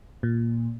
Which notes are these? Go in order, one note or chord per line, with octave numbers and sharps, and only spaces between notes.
A#2